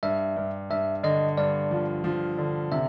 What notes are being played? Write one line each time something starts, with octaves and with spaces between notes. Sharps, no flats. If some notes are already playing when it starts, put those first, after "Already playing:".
G2 E5
G2
G2 E5
D3 D#5
G2 D5
F3
F3
D3
C3 E5